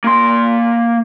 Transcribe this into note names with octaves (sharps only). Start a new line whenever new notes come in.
A#3 C6